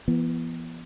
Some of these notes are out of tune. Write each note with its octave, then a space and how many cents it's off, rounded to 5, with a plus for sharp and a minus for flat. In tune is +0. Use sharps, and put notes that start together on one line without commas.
E3 +40 B3 -20